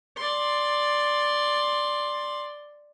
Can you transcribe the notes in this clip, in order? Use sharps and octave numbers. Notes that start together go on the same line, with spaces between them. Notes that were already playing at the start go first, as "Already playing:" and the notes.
D5 C6